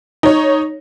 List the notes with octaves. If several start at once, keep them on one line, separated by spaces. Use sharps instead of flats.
D#4 C#5